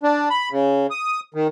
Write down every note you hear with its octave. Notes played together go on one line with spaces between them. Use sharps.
D4
B5
C#3
D#6
D#3